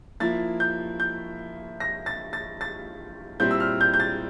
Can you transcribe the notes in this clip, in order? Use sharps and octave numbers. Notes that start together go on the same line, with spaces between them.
F3 A#3 E4 A6
G6
G6
A#6
A6
A6
A6
A#2 G3 C4 E4 G6
E6
F6
G6
G6
A6